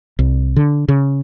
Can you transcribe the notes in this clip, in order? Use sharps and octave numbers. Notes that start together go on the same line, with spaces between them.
C2
D3
C#3